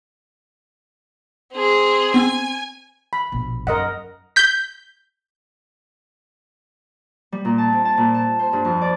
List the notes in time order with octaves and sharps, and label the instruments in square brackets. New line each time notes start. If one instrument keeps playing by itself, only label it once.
[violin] C4 G#4
[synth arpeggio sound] B3 C4 [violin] G#5
[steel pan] B5
[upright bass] A#1 B2
[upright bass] F#2 [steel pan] A#4 D#5 F#5
[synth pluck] G6 B6
[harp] G3
A#2
A5
C4
A5
A#2
A5
C5
G2
F2
D5